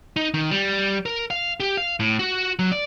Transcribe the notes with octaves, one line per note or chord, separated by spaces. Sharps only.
D#4
D#3
G3
A#4
F5
G4
F5
A2
F#4
F#3
D5